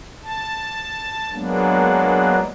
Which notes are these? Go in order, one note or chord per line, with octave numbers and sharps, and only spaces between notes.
A5
F#3 G#3 A#3 B3 D4